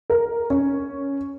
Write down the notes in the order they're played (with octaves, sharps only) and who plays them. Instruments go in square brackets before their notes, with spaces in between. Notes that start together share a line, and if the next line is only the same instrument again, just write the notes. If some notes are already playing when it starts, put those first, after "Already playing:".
[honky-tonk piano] A#4
C#4